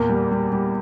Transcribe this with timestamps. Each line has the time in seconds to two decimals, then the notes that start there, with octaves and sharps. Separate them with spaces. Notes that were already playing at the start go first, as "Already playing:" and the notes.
Already playing: E2 A#2 A#3
0.09 G3
0.32 G3
0.53 G3